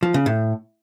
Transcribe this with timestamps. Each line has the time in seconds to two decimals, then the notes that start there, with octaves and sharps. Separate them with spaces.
0.03 F3
0.14 C#3
0.26 A2